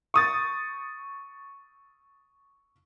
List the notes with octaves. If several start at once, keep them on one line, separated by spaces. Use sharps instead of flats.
C#6 D#6 A6